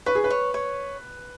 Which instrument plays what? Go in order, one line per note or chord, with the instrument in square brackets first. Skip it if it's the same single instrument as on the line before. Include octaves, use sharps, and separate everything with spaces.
[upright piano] B4 [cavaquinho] C#6
[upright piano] G#4
B4
[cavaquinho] C#5
C#5